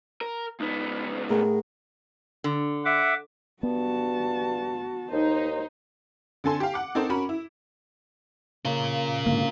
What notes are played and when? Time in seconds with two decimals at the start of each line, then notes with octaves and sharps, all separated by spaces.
0.21 A#4
0.60 C#2 B3 D#4
1.30 A2 G#4 A#4 F#5
2.44 D3
2.85 E5 F#5 D6
3.63 G2 B3 F#4 A5
5.11 D#2 D#4 C5
6.44 D3 C4 A4 G#5 C6
6.60 G4 F5
6.74 F#5 D6
6.95 C4 D#4 A4 A#4 C5
7.10 C#4 F#4 A#4 B5
7.29 E4
8.65 C#3 F4 A#4
9.26 G#2 D3 A#3